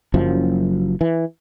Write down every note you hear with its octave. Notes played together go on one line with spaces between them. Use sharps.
F#1 F#2 F3
E3